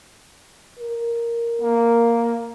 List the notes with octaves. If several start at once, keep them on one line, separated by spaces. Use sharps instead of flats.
A#4
A#3